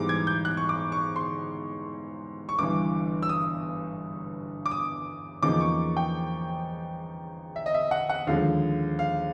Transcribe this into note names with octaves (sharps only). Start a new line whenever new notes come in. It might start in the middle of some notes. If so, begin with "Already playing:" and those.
Already playing: G#2 E3 G3 B3 D6
G#6
G6
F#6
C#6
D6
C#6
C6
C#6
G1 G2 E3 D6
E6
D#6
D6
D#6
E2 C#3 F3 A#3 D#4 D6
C#6
G5
E5
D#5
E5
F#5
F#5
D#2 D3 F3 G#3 F5
F5